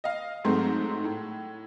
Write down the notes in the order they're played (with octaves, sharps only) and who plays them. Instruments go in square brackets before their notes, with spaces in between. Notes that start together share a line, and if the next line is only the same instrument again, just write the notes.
[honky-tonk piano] D#5 F5
G#2 F#3 G#3 A3 C4
A2